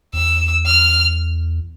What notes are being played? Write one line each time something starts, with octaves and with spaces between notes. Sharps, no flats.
E2 E6
F6